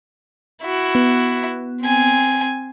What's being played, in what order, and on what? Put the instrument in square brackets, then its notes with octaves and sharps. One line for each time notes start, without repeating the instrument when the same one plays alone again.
[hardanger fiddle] E4 F#4
[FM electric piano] B3
[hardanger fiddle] C4 G#5